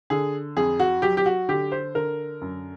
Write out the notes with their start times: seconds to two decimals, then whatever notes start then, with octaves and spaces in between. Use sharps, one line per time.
0.10 D3 G#4
0.57 F2 G#4
0.80 F#4
1.02 F#3 G4
1.17 G4
1.26 F#4
1.48 D3 G4
1.72 C5
1.95 D3 A#4
2.41 F#2